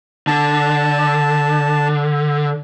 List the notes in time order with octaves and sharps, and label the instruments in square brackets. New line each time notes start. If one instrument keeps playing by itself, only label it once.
[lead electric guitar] D3 [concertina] A5